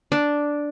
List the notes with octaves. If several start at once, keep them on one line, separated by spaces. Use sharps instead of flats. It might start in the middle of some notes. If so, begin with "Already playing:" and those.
D4